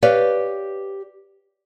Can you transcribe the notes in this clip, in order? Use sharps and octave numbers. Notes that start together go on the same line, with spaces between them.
G4 B4 C#5 D5 F5